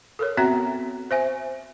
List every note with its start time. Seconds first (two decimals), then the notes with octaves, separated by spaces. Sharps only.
0.19 A4 A#4 C#5
0.37 B3 C4 F#4 E5 A#5
1.11 C5 E5 G#5